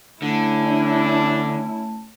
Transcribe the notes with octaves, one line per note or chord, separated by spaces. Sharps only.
D3 A3 C#4 E4 A5
D4